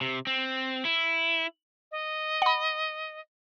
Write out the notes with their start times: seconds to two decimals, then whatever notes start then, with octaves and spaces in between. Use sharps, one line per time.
0.01 C3
0.27 C4
0.85 E4
1.91 D#5
2.42 F#5 B5